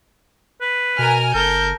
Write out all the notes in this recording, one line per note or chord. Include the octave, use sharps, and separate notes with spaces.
B4
B2 A#4 G#5 F6
F#1 A4 A#4 G6